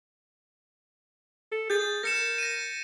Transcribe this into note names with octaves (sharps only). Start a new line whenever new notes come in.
A4
G#4 G6 A6
A#4 A#6 C#7 E7
A#6 D#7